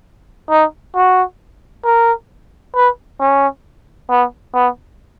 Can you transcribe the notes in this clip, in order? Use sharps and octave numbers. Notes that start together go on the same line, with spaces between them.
D#4
F#4
A#4
B4
C#4
B3
B3